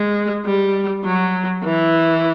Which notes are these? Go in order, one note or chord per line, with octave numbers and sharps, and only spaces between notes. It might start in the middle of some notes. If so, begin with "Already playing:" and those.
Already playing: G#3
G3
F#3
E3